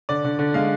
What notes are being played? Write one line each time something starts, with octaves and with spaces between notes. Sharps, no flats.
D3 D5
D3
D3
G#3 F5